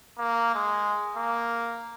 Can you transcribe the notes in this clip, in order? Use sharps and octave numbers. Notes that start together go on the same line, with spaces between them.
A#3
G#3
A#3